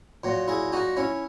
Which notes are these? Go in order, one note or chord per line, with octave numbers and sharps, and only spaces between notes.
A#2 F#3
E4 G#4
D#4 F#4
C#4 E4